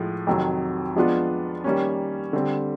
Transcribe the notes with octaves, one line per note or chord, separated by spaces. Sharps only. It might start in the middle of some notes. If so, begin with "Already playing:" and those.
Already playing: A2 F3 G#3
F2 C3 D#3 F#3
F3 G#3 B3 D4 F4
D#3 G3 A#3 C#4
D3 G3 C4